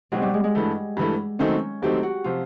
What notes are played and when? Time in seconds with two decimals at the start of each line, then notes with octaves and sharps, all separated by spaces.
0.12 B2 F#3 G#3 C4 D#4 G4
0.22 G3
0.34 G#3
0.44 G#3
0.55 G2 E3 A3
0.97 G2 E3 A3
1.39 D#3 F#3 A3 C4 C#4 D#4
1.82 D#3 F#3 A3 C4 D#4 G4
2.03 F#4
2.24 C3 F3 F4